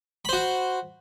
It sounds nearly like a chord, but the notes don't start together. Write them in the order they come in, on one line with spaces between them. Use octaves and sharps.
B5 C5 F#4